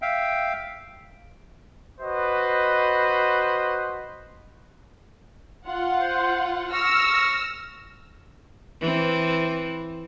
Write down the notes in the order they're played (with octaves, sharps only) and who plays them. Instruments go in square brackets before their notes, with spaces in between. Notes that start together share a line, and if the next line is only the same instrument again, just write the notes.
[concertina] E5 F5 G5
[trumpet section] F#4 B4 C5 D#5
[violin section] F4 F#5
[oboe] C5
[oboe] C#6 [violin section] E6 F6 A#6
[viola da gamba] E3 C4